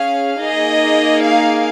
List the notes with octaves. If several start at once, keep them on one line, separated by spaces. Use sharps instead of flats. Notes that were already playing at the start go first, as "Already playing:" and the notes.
Already playing: C#4 G#4 F5
A#3 D#4 G#4 D#5
F5